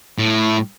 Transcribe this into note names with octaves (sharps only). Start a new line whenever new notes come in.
A2